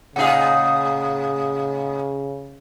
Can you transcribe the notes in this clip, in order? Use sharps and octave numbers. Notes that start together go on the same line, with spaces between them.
A2 C#3 D#4 G#4 F5 F#5